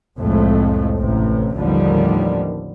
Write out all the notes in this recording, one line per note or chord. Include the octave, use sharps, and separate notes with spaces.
C2 F2 A2 G#3 A3
A1 C3
A1 D#2 D3 D#3 F3 G3